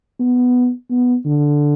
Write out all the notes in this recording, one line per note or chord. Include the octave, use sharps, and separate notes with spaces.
B3
B3
D3